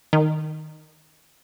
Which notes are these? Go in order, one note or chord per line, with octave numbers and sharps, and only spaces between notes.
D#3